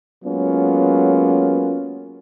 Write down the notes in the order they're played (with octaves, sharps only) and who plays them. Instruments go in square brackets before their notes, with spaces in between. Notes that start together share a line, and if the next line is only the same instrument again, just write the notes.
[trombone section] F#3 G#3 A#3 B3 C#4 F4